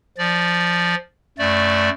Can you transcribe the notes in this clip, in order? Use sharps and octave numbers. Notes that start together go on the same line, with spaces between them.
F3 D5
F#2 A3 D5